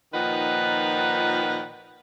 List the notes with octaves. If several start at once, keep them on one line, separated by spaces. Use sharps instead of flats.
A#2 D#3 F3 D#4 B4 F#5